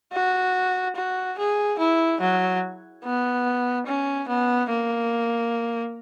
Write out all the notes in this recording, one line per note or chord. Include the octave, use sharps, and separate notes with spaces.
F#4
F#4
G#4
E4
F#3
B3
C#4
B3
A#3